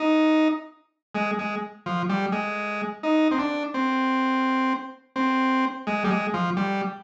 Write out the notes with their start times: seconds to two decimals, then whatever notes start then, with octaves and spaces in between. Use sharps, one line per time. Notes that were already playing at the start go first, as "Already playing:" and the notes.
Already playing: D#4
1.15 G#3
1.39 G#3
1.86 F3
2.09 G3
2.32 G#3
3.03 D#4
3.31 C4
3.39 D4
3.74 C4
5.16 C4
5.87 G#3
6.04 G3
6.10 G#3
6.34 F3
6.57 G3